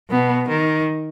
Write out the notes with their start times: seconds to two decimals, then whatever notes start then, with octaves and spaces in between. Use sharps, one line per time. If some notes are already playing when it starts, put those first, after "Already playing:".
0.10 B2 B3
0.48 D#3